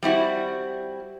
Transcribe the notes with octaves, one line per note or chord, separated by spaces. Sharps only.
G3 C4 E4 F#4